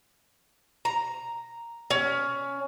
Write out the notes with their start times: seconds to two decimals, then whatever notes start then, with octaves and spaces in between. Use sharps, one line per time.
0.85 A#5
1.90 C#4